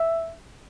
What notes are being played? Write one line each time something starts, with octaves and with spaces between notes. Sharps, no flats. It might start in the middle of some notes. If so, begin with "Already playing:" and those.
Already playing: E5